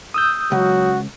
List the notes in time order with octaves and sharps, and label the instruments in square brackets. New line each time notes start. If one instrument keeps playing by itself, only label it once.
[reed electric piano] D#6 E6 G6
[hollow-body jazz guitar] C#2 [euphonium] F#3 [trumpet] F#4